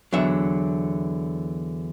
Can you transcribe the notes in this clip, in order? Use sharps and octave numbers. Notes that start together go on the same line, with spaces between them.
E2 D3 F#3 E5